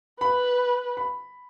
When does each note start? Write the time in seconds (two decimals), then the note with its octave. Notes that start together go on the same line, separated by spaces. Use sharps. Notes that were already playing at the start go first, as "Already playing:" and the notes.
0.21 B4 B5
0.97 B5